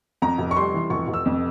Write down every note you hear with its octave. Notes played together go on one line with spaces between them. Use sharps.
F2 A#5
F1
C#6
G3 C6
E3
F1 C#6
F1
E6
F2